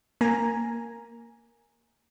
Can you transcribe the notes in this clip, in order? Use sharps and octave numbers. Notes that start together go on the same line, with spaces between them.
A#3 G#5 A#5